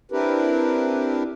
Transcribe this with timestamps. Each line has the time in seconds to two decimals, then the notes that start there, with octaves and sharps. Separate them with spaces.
0.11 C4 D4 E4 G4 A#4 B4